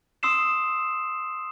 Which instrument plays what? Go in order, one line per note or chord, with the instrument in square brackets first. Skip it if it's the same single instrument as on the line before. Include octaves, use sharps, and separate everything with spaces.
[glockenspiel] C6 D#6 E6 C7 E7